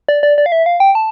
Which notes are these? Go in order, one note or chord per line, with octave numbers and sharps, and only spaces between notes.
D5
D5
D5
F5
E5
F5
G5
A5